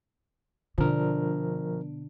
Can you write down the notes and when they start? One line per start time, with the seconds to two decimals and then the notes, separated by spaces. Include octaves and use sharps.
0.78 B2 D3 F3 D4 A#4